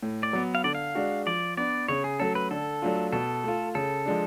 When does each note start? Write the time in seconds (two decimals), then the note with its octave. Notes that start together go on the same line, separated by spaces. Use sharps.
0.03 A2
0.23 D5
0.33 F#3 B3
0.55 F5
0.64 D3 D5
0.75 F5
0.95 G#3 D4 F#4
1.27 F3 D5
1.57 B3 D4 D5
1.88 C#3 C#5
2.04 G#4
2.20 F#3 A3 C#4 A4
2.35 B4
2.51 D3 A4
2.82 F#3 A3 D4 F4
3.13 B2 A4
3.44 A3 F4
3.75 C#3 A4
4.06 F3 G#3 D4